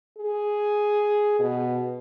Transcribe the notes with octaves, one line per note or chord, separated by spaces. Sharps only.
G#4
B2